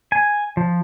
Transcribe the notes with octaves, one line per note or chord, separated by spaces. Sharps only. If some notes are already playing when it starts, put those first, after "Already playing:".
G#5
F3